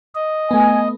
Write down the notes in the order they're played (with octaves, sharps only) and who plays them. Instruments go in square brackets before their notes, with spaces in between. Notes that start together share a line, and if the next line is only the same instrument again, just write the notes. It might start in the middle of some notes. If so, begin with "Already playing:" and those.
[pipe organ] D#5
[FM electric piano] A3 B3 [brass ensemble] G#5